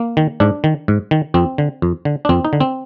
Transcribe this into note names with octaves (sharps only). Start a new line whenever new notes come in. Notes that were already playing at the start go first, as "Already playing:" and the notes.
Already playing: A#3
D#3
G#2 D4
D#3
G#2
D#3
F2 C4
D3
F2
D3
D4
F2 C4
D#4
D3
C4